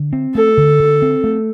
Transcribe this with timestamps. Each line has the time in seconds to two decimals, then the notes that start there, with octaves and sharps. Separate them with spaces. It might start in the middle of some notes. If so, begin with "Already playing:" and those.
Already playing: D3
0.13 C4
0.35 A3 A4
0.57 D3
0.79 D3
1.02 C4
1.24 A3